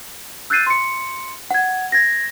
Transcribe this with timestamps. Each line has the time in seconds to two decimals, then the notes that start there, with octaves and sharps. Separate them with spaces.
0.50 E6 F#6 G6 A6 C7 D#7
0.67 C6 C#7
1.51 F#5 G#6
1.92 G#6 A#6